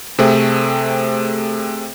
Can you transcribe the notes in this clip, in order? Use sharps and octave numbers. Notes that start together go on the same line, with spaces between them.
C3 A3 C4 G#4 E5